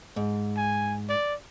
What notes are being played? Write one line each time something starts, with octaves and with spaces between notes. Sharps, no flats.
G#2
G#5
D5